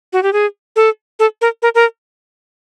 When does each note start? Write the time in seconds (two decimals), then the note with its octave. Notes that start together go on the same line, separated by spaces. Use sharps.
0.13 F#4
0.23 G4
0.33 G#4
0.76 A4
1.19 A4
1.41 A#4
1.62 A#4
1.75 A#4